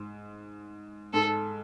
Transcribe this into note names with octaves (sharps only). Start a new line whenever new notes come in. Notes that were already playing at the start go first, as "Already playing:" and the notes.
Already playing: G#2
G#2 A4